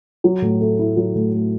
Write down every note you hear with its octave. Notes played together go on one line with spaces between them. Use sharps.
F#3
A2
A3
E4
F#3
A2
A3